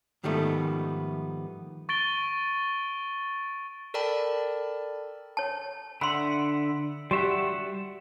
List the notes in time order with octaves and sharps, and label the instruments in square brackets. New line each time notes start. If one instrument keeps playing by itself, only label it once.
[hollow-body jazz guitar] G#2 D#3 F3 G3 A3 B3
[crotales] C#6 A6 D7 G7
[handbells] A4 A#4 D5 G5 A5 B5
[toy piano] C#5 A5
[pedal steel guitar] D3 E5 F#5 [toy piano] B5 C6
[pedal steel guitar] G3 E5 F#5 [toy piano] F#4 G4